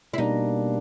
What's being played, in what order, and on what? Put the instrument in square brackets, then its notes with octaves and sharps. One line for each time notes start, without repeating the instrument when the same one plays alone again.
[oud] E4
[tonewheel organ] B2 G3 A#3 D4 [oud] D#4